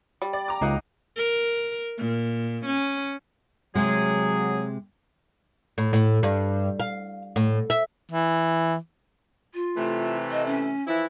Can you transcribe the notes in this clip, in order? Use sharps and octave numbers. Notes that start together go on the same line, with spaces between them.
G3
D5
A#5 D6
C#2 A#3 D#4 F#5
A#4
A#2
C#4
C3 F#3 G#3 G#4
A2
A2
G2
F5
A2
E5
E3
F4
C3 E3 A3
D#5
C#4
E3 F3 E4